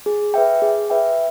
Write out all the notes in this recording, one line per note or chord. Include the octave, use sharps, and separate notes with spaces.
G#4
B4 E5 G5
G#4
B4 E5 G5